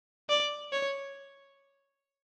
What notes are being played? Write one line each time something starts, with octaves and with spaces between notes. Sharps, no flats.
D5
C#5